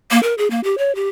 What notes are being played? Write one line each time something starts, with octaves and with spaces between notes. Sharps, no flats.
A#3
A#4
G#4
A#3
G4
C#5
G4